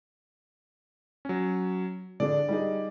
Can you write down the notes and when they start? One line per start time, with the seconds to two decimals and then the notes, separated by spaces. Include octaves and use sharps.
1.25 F#3 C#4
2.20 D3 D4 G#4 D5
2.48 G3 D#4 G#4